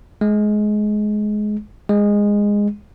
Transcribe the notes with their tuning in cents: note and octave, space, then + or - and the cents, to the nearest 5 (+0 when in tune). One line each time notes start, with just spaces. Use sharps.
G#3 +20
G#3 -15